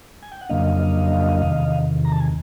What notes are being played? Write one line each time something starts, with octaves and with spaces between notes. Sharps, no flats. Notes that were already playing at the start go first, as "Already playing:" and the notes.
G#5
G5
F#5
F2 C#3 F#3 A#3 D4 D#5 F5
E2 C3 D#3
A#5
A5
G#5